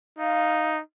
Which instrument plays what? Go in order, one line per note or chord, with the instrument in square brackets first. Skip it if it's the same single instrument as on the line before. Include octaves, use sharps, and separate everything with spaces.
[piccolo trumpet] D#4 [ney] F5